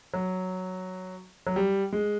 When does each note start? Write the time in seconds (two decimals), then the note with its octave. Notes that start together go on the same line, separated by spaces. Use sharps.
0.14 F#3
1.47 F#3
1.56 G3
1.93 G#3